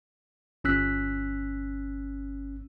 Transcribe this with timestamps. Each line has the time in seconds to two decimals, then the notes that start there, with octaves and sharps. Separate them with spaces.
0.64 G1 C#4 E6 F#6 B6